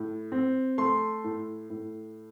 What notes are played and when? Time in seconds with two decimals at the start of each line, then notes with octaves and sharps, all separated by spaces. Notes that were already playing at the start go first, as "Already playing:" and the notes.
Already playing: A2
0.32 C4
0.78 A3 C6
1.24 A2
1.70 A2